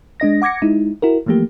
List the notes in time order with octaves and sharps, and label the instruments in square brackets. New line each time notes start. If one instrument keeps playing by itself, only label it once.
[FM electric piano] G#3 D4 D#5 A#6
F#5 D6 G#6 A#6 C#7
G#3 D#4 E4
E4 F#4 A#4
E3 F3 A3 A#3 G4